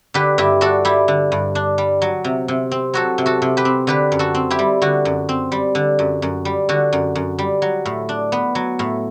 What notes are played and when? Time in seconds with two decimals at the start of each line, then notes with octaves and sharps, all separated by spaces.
0.14 D3 G4 B4
0.38 G2 E4 G4
0.61 D4 F#4 A4
0.85 G3 E4 G4
1.08 D3
1.32 G2
1.55 D4
1.78 G3
2.02 F#3
2.24 C3
2.48 C3
2.71 C4
2.94 F#3 F#4 A4
3.18 C3
3.26 F#4 A4
3.42 C3
3.57 G4 B4
3.65 C4
3.87 D3 G4 B4
4.12 F#2
4.19 F#4 A4
4.35 C4
4.50 E4 G4
4.59 G3
4.82 D3 F#4
5.05 F#2
5.29 C4
5.52 G3
5.75 D3
5.99 F#2
6.22 F#2
6.45 G3
6.69 D3 F#4
6.93 F#2
7.15 F#2
7.39 G3
7.62 F#3
7.85 A2
8.09 D4
8.32 B3
8.55 F#3
8.79 A2